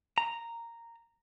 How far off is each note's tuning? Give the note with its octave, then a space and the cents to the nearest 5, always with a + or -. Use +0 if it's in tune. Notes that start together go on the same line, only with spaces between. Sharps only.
A#5 -5